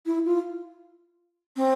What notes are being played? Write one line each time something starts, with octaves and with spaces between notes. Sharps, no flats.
E4
F4
C4